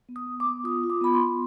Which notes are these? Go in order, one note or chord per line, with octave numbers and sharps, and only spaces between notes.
B3
D#6
B3
D6
B3
F4 D#6
F4
D6
B3 B5
C6
B3